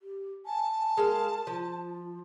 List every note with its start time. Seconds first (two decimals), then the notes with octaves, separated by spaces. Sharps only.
0.01 G4
0.46 G#5 A5
0.97 G#3 A4 A#4 F5
1.47 F3 F4